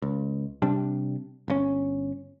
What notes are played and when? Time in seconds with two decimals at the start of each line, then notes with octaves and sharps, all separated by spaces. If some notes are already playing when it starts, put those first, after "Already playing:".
0.02 C#2
0.62 C3 G3 D4
1.48 G1 C3 C#4